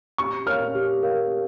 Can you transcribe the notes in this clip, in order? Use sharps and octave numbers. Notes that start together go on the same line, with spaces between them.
G4 C#6
A#4 C#5 F5 F6
G4
A#4 C#5 F5
G4